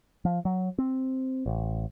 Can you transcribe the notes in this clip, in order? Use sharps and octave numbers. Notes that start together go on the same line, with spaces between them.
F3
F#3
C4
A1